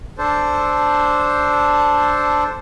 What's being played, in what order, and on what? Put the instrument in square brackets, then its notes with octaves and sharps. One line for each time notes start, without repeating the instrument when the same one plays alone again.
[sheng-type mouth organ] D4 A4 C5